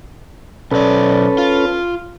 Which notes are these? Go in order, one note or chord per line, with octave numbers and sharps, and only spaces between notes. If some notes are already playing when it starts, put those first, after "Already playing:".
B1 C#4 A4 B4 D5
F4